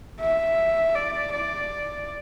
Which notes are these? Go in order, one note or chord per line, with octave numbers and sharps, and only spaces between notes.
E5
D5
D5